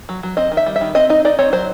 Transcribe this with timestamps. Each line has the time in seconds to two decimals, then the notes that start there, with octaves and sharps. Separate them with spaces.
0.09 F#3
0.23 F#3
0.37 C4 D#5
0.52 D#3
0.57 E5
0.66 G3
0.76 E5
0.81 D#3
0.95 C4 D#5
1.10 D#4 D#5
1.25 D#4 D5
1.39 C4 C#5
1.53 F#3 C5